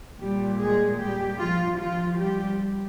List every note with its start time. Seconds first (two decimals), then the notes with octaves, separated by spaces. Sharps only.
0.20 A#2 G3 G4
0.60 G#3 G#4
1.00 G3 G4
1.40 F3 F4
1.79 F3 F4
2.20 G3 G4